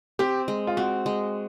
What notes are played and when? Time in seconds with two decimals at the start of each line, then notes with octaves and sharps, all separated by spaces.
0.19 C4 G4
0.48 G#3
0.67 F4
0.77 C4 F#4
1.06 G#3